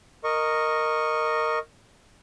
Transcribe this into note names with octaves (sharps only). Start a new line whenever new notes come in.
A#4 D#5 C#6